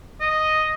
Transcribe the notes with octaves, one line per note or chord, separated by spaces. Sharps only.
D#5